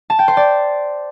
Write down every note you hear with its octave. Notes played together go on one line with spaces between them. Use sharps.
A5
G5
C5
D5